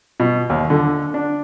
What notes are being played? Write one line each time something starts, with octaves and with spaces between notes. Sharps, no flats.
B2
D#2
D3
D4